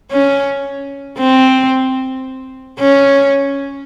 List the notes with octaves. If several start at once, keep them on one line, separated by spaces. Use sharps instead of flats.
C#4
C4
C#4